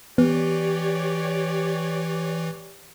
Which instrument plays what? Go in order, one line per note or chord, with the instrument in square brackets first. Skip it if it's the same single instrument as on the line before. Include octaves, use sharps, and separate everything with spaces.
[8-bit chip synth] E3 [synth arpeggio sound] B3 [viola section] G4 C#5 D5